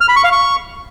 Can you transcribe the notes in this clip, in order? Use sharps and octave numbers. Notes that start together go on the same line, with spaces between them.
F6
B5
C#6
F5
C#6